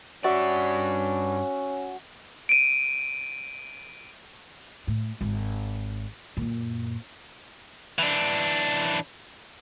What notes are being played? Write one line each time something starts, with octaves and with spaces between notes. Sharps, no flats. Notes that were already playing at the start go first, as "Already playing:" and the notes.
G2 C#4 F#4 D5 E5
D7 D#7
A2
G#1
F#2 A#2
E3 D4